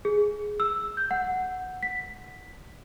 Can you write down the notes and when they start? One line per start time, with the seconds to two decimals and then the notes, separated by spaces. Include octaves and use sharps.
0.05 G#4
0.60 E6
0.97 G6
1.11 F#5
1.83 B6